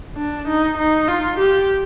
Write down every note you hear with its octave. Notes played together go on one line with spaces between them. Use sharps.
D4
D#4
D#4
F4
G4